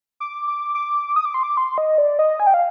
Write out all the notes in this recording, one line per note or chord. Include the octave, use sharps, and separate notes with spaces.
D6
D6
D6
D#6
D6
C6
D6
C6
D#5
D5
D#5
G#5
G5
F5